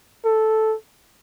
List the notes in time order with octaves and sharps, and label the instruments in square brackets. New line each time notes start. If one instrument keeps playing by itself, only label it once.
[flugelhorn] A4